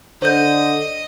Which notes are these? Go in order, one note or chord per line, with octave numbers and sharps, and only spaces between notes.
D3 C5 D#5 G6